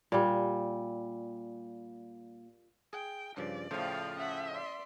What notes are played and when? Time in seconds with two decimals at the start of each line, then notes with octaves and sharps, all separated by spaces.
0.12 A#2 G3
2.93 G#4 G5
3.37 G2 C#3 F3 D5
3.71 A2 C#3 F3 A3 C5 F5
4.16 C#4 E5 F#5
4.52 D5 C6